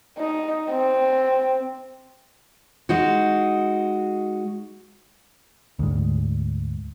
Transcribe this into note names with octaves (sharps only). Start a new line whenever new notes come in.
D#4
C4
G#3 D#4 F#4
D2 G#2